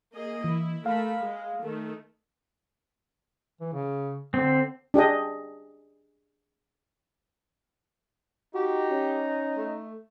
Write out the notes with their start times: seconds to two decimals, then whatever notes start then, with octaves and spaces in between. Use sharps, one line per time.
0.16 A#3 G#4 D#5
0.44 E3 E4
0.86 A3 A#4 F5 B5
1.22 G#3
1.62 D#3 A3
3.61 E3
3.73 C#3
4.34 D3 C4
4.94 D4 G4 G#4 D#5
8.55 D#4 F#4 G4
8.91 C#4
9.57 A3